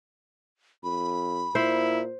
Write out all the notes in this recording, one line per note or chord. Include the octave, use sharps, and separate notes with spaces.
F2 B5
A#2 E4 C5